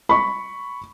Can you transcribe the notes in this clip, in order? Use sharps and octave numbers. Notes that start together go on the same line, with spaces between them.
B5 C#6